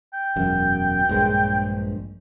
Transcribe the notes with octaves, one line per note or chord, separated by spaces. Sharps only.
G5
E1 F#2
A#1 G2 G#3